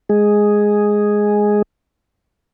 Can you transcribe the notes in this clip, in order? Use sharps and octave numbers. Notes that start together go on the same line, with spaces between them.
G#3 G#4